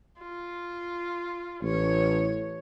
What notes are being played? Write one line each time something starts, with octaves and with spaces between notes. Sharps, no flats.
F4
A1 C#5